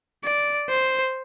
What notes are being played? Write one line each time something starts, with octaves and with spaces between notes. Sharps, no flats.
D5
C5